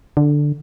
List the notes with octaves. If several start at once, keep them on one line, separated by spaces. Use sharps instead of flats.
D3